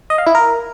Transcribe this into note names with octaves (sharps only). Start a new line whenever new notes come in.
D#5
F5
E4
A#4